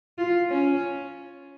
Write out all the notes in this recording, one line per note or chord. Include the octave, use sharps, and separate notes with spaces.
F4
C#4